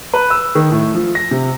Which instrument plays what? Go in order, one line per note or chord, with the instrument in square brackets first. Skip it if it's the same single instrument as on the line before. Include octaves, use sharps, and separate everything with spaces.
[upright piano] B4
E6
D#3
A2
F3
A#6
C3